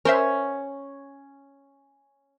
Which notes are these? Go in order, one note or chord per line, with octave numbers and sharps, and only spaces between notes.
C#4 A#4 C5 E5